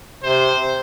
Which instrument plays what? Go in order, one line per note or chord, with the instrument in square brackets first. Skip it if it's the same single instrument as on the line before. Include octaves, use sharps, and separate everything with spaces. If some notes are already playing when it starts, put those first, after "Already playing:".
[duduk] C3 [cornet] C5